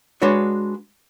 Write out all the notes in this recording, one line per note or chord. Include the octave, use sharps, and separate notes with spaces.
G#3 D4 F#4 B4 C#5